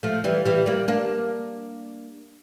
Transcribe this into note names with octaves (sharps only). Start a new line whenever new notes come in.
F3 A3
E3 G3
E3 G3
G3 A#3
A#3 D4